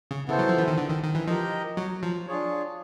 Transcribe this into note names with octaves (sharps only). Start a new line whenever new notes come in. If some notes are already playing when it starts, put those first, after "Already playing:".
C#3
C#3 B3 E4 A4 C5
F#3
F3
E3
D#3
D3
D#3
D#3
E3
F3 G4 A#4 D#5
F#3
F3
D4 F4 G#4 C#5